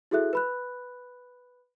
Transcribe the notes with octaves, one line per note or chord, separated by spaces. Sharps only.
E4 F#4 G#4 A4 E5 F#6
B4 B5 F#6